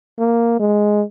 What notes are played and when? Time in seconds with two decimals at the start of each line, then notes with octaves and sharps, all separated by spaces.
0.19 A#3
0.60 G#3